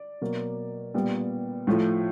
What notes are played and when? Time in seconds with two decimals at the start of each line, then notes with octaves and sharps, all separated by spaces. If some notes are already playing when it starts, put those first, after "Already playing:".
Already playing: D5
0.21 B2 F#3 A#3
0.94 A#2 G3 B3
1.67 A2 F3 A3